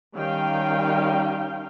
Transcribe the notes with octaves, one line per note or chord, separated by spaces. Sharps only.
D#3 G3 C#4 F5 G5